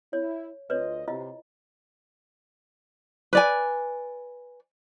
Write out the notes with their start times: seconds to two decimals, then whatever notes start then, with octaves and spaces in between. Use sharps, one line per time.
0.13 E4 C#5
0.70 D2 F4 B4 C#5 D#5
1.08 C3 E4 F4 D#5
3.33 B4 D5 G#5